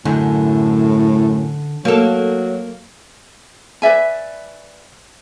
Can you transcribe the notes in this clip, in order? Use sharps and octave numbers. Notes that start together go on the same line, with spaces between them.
F#2 A2 D3
F#3 A#3 A4
B4 D5 E5 G#5